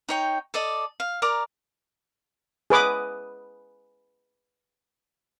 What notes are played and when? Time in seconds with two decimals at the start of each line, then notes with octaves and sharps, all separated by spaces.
0.09 D#4 C#5 G5
0.54 A4 D5 D#5
1.00 F5
1.22 A#4 D5 A#5 D6
2.70 G#4 B4 D6 D#6